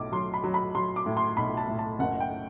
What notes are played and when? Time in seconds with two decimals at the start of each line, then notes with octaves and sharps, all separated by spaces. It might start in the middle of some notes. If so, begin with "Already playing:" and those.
Already playing: B1 A2 D6
0.12 F#3 C6
0.34 B5
0.44 F#3
0.54 B5
0.75 F#3 C6
0.96 D6
1.06 A2
1.17 C6
1.37 B1 B5
1.57 A5
1.68 A2
1.79 A5
1.99 F#1 F#5
2.20 G5